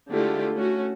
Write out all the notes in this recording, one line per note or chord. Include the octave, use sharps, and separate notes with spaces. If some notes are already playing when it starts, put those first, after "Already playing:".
D3 G#3 A3 E4 F4 G4
A3 C#4 F#4